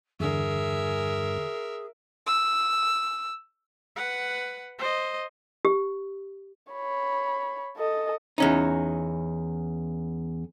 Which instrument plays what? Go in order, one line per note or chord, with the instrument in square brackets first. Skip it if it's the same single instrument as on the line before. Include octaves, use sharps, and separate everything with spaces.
[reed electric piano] E2 D3 [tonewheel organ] G2 [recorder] G#4 [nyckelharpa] A#4 E5
[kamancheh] E6
[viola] B4 F#5
C5 D#5
[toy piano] G4
[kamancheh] C#5 B5
A4 D#5
[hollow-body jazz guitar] E2 C#4 D#4